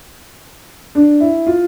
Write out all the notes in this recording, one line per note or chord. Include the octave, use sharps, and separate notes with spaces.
D4
E4
F4